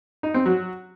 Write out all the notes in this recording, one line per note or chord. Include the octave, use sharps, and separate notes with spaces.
D#4
C4
F#3